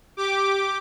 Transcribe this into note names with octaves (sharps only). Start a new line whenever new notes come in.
G4 D6